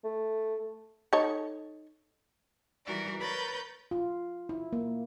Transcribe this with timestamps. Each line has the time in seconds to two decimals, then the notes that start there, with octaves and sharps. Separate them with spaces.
0.04 A3
1.13 D#4 A4 C#5
2.86 E3 G3 F#4 A#4 D5
3.20 A#4 B4 C#5 B5 G6 A6
3.91 F4
4.49 E4
4.73 A#3